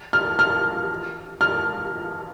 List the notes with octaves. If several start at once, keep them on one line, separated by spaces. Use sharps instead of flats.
F6
F6
F6